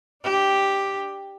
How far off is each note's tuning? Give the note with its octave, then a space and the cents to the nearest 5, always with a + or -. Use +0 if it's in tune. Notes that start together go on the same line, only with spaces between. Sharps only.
D4 +15 G4 +0